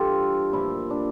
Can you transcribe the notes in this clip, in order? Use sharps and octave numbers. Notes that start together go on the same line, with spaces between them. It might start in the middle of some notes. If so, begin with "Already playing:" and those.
Already playing: G2 E3 F4 G4 A4
A#2 F3 E4
D4